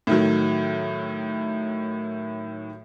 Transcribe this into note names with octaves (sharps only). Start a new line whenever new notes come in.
A2 D#3 F#3